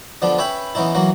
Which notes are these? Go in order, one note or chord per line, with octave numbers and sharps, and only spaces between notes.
D3 F3 B3 D4
C#4 B4 C#5 E5 G5 B5
E3 B3 C#4 D#4 E4
E3 F#3 A#3 F#4